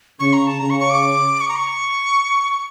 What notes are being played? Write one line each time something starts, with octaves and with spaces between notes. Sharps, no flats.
C#3 C#6
A#5
A5
C#3 A#5
C#6
C#6
D6
C#6
A#5
C#6